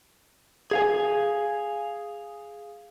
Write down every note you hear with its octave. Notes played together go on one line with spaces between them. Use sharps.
G#4 F5 G#5